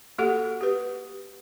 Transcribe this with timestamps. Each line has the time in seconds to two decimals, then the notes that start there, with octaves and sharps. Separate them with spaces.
0.18 A#3 F#4 G4 A4 F#5
0.61 G4 B4